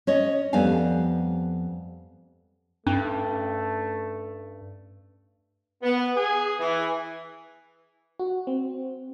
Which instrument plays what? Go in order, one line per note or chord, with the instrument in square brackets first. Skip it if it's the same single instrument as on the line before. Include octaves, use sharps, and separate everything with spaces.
[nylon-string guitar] C#4 C#5 D#5
F2 G3 B3 F5 G#5
[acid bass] G2 [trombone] A3 [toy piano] C#4
[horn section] B3
G#4
E3
[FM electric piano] F#4
C4